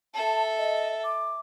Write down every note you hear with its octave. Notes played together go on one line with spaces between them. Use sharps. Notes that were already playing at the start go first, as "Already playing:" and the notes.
A4 E5 A5
D#5
D6